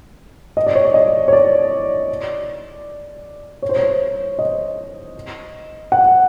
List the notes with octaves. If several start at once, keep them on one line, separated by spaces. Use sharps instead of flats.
D#5
D5
C#5
D5
D#5
C#5
D5
C#5
C5
C#5
D#5
F#5